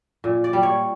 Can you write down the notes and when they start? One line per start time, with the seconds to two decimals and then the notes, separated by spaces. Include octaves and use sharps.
0.24 A#2
0.44 D5
0.53 G3
0.63 C#5